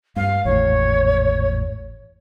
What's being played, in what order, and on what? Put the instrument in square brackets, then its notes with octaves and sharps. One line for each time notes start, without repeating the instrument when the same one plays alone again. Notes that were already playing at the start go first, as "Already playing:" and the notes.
[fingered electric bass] G2 [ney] F5
[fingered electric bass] G#1 E2 A2 [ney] C#5